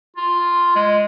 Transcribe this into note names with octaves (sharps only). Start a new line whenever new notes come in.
F4
G#3